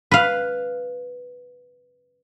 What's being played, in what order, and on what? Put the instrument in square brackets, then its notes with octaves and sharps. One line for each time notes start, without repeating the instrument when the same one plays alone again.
[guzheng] B4 F5